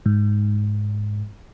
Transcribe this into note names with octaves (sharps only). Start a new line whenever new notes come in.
G#2